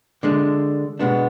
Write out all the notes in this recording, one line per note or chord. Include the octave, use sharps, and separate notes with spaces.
D3 G#3 D4
B2 G#3 B3 D4